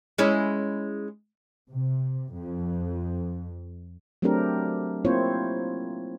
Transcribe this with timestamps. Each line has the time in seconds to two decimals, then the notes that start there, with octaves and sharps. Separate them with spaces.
0.18 G#3 C#4 E4
1.69 C3
2.34 F2
4.22 F#3 A3 C4 D4 G4 A#4
5.05 A#3 C4 E4 F4 C5 C#5